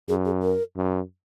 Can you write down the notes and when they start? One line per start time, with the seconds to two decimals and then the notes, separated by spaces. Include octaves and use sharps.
0.08 F#2 G#4
0.25 G#4
0.42 A#4
0.77 F#2